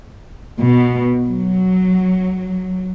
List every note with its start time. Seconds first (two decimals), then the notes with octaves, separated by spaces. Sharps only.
0.62 B2
1.25 F#3